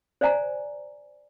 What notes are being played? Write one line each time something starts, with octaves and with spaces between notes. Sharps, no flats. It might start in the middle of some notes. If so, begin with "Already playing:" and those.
C5 D5 F5 G#5 A#5